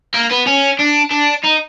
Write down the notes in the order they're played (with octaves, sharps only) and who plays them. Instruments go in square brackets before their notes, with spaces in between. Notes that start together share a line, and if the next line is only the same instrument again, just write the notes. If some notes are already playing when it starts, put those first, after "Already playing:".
[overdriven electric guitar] A#3
B3
C#4
D4
D4
D#4